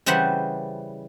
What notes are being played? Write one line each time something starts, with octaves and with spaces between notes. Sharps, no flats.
C#3 E3 G3 C5 F#5